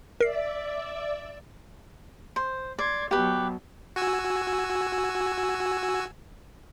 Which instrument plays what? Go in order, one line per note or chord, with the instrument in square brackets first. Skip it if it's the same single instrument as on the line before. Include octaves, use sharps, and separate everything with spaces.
[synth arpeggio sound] A#4 C7 [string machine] D5 E5
[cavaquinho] C5
[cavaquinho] D5 [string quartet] C6 G#6
[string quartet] B2 F#3 [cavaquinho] G4 B4
[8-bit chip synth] F#4 G#5 E6